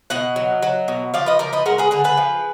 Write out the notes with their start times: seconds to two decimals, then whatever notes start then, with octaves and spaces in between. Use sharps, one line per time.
0.10 B2 D#5 F#5
0.36 F#3
0.63 F#3
0.88 B2
1.14 F3 D5 F5
1.26 B4 D#5
1.39 F3 A#4 D5
1.53 B4 D#5
1.66 G#3 F#4 A#4
1.78 G#4 B4
1.91 D3 G#4 B4
2.04 G#4 B4
2.17 F3